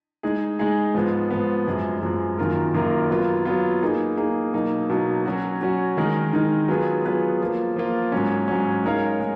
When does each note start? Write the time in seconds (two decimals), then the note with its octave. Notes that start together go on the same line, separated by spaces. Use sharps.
0.23 G#3 D#4 G#4
0.59 G#3 D#4 G#4
0.95 G#2 F3 B3
1.30 G#2 F3 B3
1.67 F#2 F3 G#3
2.02 F#2 F3 G#3
2.38 F#2 D#3 A#3 F4 A#4
2.74 F#2 D#3 A#3 F4 A#4
3.10 F#3 B3 F4
3.46 F#3 B3 F4
3.82 A#3 D#4 G#4
4.17 A#3 D#4 G#4
4.53 B2 F#3 A#3 D#4
4.89 B2 F#3 A#3 D#4
5.25 F#3 C#4 F#4
5.61 F#3 C#4 F#4
5.97 D#3 G#3 D#4 A#4
6.33 D#3 G#3 D#4 A#4
6.68 F#3 B3 F4 G#4 B4
7.05 F#3 B3 F4 G#4 B4
7.41 F3 A#3 F4
7.76 F3 A#3 F4
8.12 G#2 F#3 C#4
8.48 G#2 F#3 C#4
8.84 G#3 D#4 A#4 C#5 F5
9.20 G#3